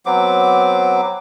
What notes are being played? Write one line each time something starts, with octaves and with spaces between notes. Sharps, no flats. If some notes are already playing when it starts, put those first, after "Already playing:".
F#3 B3 C4 D6